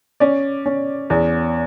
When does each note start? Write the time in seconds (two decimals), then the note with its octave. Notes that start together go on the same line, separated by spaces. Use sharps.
0.20 C#4 D5
0.66 C#4
1.10 E2